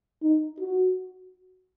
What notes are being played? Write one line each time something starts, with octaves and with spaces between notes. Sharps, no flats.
D#4
F#4